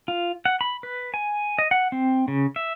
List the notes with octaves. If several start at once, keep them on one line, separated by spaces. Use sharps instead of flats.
F4
F#5
B5
B4
G#5
D#5
F#5
C4
C#3
E5